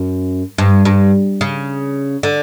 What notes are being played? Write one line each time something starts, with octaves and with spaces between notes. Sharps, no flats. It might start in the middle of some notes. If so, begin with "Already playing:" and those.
Already playing: F#2
G2
G2
C#3
D3